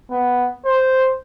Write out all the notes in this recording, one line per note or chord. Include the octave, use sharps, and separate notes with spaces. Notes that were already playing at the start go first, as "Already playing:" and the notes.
B3
C5